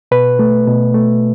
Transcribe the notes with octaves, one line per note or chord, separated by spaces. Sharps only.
B2 B4
A3
B2
A3